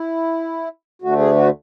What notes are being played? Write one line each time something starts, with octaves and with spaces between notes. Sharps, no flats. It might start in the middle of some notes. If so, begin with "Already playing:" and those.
Already playing: E4
D2 D3 A3 F#4
G#4
F#4